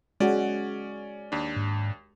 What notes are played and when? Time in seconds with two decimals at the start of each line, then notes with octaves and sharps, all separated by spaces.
0.20 G#3 C#4 F#4 D5
1.32 D#2 D4
1.56 G#2